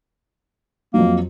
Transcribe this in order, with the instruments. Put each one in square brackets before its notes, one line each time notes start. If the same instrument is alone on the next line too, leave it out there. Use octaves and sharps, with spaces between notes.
[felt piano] F2 F#3 [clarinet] A#3